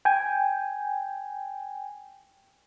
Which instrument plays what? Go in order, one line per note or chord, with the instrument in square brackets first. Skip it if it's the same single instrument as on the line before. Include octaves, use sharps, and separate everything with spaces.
[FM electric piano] G5 G#5